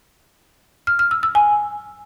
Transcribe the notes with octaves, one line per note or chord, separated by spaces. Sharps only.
F6
F6
E6
E6
G#5